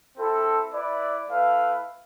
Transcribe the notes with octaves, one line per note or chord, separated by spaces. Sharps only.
C4 E4 A4
E4 B4 D5
A3 E4 B4 F5